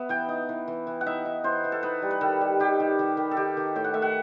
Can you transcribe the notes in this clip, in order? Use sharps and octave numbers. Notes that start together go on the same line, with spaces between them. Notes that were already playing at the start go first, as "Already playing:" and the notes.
Already playing: B3 E5
E3 G5
D#4
E3
E3
E3
F#5
D#4 E5
D#4
E3 C5
E3
A4
D#4 B4
G3
B4
D#3 A4
G3
D#3 G4
D#3
D#3
D#3
A4
D#3 G4
D#3
A2 G5
F#5
A2 E5
F#5